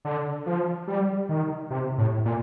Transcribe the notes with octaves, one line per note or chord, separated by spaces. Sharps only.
D3
F3
G3
D#3
C3
A2
A#2